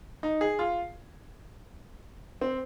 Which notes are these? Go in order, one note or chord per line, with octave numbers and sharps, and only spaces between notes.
D#4
G#4
F4
C4